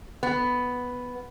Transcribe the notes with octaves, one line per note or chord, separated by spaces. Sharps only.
B3